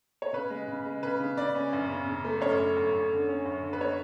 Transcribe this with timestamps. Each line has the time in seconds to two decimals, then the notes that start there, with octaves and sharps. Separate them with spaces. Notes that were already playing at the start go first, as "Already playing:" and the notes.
0.22 C#5
0.33 C#3 B4
0.50 G#3
0.68 C#3
0.85 G#3
1.03 C#3 B4
1.20 C#3
1.37 C#3 D5
1.55 C#4
1.73 F#2
1.89 C#3
2.07 C#3
2.25 A3
2.41 F#2 C#5
2.60 F#2
2.77 F#2
2.93 F#2
3.12 D3
3.29 C#4
3.45 F#2
3.63 D3
3.73 B4
3.81 C#5